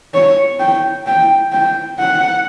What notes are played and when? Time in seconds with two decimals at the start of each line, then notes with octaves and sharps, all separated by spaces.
0.14 C#5
0.60 G5
1.07 G5
1.52 G5
1.99 F#5